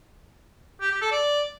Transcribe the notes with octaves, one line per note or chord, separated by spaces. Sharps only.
G4
G4
A4
D5